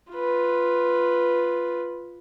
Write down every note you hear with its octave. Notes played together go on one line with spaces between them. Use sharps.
F4 B4